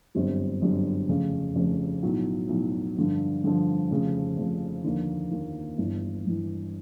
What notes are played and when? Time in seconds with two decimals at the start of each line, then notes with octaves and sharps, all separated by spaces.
0.15 G1 F#2 D3 G3 C4
0.62 G1 F#2 D3 G3 C4
1.09 F1 F2 C#3
1.56 F1 F2 C#3
2.03 B1 A2 F#3
2.49 B1 A2 F#3
2.97 G2 D3 F3
3.44 G2 D3 F3
3.90 F1 F2 C#3 F3
4.37 F1 F2 C#3 F3
4.84 D#2 D3 F3 A#3
5.31 D#2 D3 F3 A#3
5.78 G1 G2 E3
6.25 G1 G2 E3